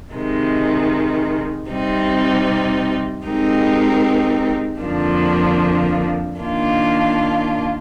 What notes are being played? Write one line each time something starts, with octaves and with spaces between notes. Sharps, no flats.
C3 D#3 G#3
C3 G3 C4 D#4
G#3 C4 D#4 G4 A#4
F2 D3 F3 A#3 D4
D#3 A#3 D4 F4